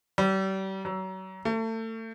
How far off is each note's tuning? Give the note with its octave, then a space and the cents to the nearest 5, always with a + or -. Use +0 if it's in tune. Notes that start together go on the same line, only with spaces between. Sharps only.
G3 -35
F#3 +30
A3 +30